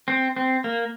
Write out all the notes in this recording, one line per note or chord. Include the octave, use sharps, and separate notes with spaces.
C4
C4
A#3